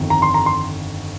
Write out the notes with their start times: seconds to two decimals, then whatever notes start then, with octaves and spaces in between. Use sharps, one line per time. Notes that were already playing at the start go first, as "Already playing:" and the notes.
Already playing: G1 F2 D#3
0.10 A#5
0.22 C6
0.34 A#5
0.46 C6